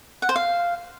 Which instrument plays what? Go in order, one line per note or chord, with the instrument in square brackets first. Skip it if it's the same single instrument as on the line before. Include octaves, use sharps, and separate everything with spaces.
[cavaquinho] F#5
C5
F5